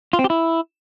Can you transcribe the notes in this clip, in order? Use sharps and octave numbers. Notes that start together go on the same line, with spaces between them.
F4
C4
G4
E4